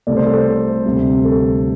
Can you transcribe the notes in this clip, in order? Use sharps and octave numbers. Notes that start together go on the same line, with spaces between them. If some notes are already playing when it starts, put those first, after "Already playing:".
C2 C3 A3 D5
C5
A4
C5
D2 C3 G3
A4